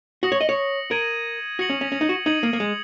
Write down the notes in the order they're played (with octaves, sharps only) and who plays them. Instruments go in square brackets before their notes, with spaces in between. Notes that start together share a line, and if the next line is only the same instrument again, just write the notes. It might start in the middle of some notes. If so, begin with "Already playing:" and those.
[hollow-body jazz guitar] F#4 [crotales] D#6 A#6 C#7 F#7
[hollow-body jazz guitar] C#5
D#5
C#5
[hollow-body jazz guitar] A#4 [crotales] G#6 D#7 F#7
[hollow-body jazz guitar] F#4 [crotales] D#6 A#6 C#7 F#7
[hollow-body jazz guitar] C#4
C#4
C#4
D#4
F#4
[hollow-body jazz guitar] D#4 [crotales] D#6 G#6 D#7 F#7
[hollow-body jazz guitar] A#3
A#3
G#3